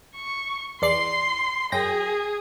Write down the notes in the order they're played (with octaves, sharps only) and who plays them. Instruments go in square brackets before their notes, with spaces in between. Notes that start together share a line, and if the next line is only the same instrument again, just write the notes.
[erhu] C#6
[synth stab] E2 D5 C7 [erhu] C6
[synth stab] F#2 G5 A#6 [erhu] G#4